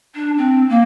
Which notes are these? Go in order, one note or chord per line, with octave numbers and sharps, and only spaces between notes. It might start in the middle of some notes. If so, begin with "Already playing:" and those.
D4
C4
A#3